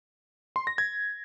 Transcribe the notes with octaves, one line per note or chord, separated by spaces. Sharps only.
C6
A#6
G#6